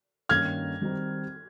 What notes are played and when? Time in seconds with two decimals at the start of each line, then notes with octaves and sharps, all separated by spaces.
0.29 G2 D#3 A#3 C#4 F6 G#6
0.82 D#3 G3 C4 D#4